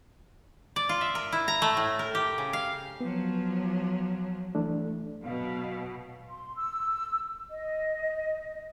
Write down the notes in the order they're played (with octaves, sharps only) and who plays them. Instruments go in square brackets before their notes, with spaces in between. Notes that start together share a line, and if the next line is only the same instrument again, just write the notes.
[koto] D5
F4
E5
A#4
E4
A#5
A3
A2
A#4
G4
C#3
F5
[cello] F3 F#3 [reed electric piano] B3
[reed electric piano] E3 A3 D4
[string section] B2 [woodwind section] F#3 F5
[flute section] C6
E6
D#5